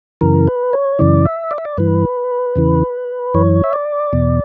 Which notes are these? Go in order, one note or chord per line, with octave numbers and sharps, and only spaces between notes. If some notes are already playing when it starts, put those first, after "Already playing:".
F#2 C#3 E3 A#4
B4
C#5
F#2 C#3 E3 D5
E5
D5
E5
D5
G2 E3 B4
E2 C#3 E3
F#2 E3 C#5
E5
D5
E2 B2